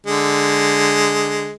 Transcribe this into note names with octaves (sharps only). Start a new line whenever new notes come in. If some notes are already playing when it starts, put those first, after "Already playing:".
D3 G#3